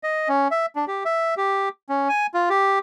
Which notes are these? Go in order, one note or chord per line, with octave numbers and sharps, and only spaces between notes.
D#5
C#4
E5
D4
G4
E5
G4
C#4
G#5
F4
G4